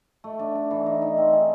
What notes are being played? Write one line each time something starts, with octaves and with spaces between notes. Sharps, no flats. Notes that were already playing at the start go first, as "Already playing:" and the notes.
A3
D4
D4
E3
D#4
D#4
C4
G#4